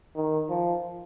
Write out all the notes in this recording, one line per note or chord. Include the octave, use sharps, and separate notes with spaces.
D#3
F3